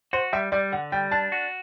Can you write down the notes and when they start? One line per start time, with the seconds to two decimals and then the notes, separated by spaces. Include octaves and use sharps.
0.13 F#4 C5
0.33 G3 E5
0.52 G3 D5
0.72 D3 F#5
0.92 G3 G5
1.11 D4 A5
1.32 F#4